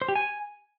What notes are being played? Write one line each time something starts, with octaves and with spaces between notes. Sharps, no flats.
C5
G4
G#5